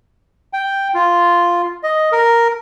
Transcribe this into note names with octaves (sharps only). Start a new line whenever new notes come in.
G5
F4
D#5
A#4